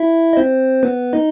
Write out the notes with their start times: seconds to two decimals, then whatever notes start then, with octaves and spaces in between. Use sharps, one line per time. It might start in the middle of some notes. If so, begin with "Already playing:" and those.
Already playing: E4 E5
0.33 D#5
0.37 C4 C5
0.83 B3 B4
1.13 D#4 D#5